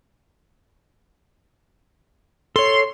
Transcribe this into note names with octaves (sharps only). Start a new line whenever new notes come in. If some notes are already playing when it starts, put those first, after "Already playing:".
A4 C#5 C6